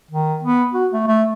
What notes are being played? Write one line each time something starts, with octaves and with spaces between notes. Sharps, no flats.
D#3
B3
F#4
A3
A3